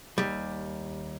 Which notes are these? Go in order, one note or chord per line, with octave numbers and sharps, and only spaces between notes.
D#2 G3